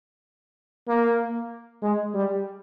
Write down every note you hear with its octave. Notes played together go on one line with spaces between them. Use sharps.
A#3
G#3
G3